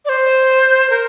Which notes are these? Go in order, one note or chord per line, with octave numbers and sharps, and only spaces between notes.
D5
C5
A#4